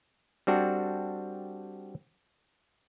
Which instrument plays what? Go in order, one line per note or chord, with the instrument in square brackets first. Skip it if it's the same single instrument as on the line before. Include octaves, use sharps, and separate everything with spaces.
[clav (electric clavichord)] G3 C4 D4 F#4 A4